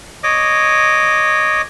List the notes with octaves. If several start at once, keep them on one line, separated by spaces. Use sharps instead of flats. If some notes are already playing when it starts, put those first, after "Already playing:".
C#5 D#5 D6